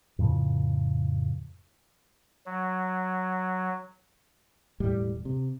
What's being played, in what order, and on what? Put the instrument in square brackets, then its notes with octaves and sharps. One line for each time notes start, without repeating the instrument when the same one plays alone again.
[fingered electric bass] F2 A2 C#3 F3
[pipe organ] F#3
[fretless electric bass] E1 A2 G3
C3